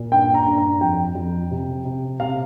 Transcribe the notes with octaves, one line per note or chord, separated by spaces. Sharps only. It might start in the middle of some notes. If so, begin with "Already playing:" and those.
Already playing: A#2
G2 G5
A#5
G2
A#5
F2 G5
F2
C3
C3
C3 F5